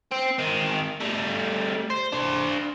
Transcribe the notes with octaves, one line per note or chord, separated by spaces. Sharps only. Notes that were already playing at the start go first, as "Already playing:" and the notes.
C4
D#3 C4
G3 A3
C5
D4 C5